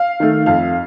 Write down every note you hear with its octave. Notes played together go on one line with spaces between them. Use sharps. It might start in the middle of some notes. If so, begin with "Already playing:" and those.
Already playing: F5
D#3 A3
F2 F5